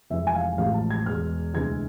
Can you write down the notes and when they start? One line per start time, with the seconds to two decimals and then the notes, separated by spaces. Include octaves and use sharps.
0.10 F1 F2 E3 G#3 E5
0.27 G#5
0.35 F5
0.58 A1 A2 F3 G#3 F5
0.74 A5
0.90 G#6
1.06 E2 B2 G#3 F6
1.54 D2 C3 E3 G#3 G#6